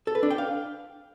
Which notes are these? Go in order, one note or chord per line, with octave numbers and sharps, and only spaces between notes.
A4
B4
D4
G5
F5